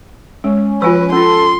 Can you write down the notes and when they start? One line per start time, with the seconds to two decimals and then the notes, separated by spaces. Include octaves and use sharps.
0.44 G#3 C#4
0.82 F3 F4 B4 G#5 E6
1.12 C#4 F4 A4 C6